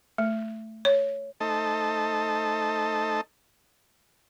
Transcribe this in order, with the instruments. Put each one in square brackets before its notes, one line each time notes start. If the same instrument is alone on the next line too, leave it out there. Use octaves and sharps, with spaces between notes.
[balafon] A3
C#5
[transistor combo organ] A3 D#4 A4 C5 D#5 A5